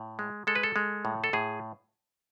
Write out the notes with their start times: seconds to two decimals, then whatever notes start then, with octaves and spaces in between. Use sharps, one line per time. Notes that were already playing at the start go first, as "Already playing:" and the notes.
Already playing: A2
0.19 G#3
0.47 G#3 A4
0.55 B4
0.63 A4
0.76 G#3
1.05 A2
1.24 A4
1.33 A2 G#4